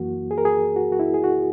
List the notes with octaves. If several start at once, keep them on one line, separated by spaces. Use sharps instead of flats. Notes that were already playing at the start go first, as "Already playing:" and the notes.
Already playing: F#2 E3 A#3 F#4
G#4
A#4
G#4
F#4
F#4
E4
G#4
F#4